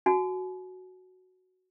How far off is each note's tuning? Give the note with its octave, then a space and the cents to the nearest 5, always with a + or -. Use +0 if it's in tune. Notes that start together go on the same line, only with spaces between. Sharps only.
F#4 +0 G#5 +40